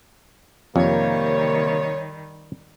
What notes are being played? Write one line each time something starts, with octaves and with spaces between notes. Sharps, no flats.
F2 C3 D#3 G3 A#3 C#5